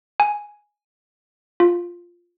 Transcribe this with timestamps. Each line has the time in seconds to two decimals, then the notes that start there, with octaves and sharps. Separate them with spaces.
0.20 G#5
1.60 F4